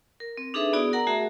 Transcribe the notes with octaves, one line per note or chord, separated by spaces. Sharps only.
A#4
C4
D4 D#4 G#4 A4 B4 E5
B3 E4 F#4 G#4 D5 D#6
A#4 F#5 A#5
A3 F#4 G#4 E5